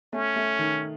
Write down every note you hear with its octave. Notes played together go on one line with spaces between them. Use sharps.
A3 C#4
A3
D#3